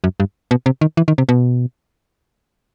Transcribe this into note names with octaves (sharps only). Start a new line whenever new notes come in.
F#2
G2
B2
C3
D#3
E3
D#3
C3
B2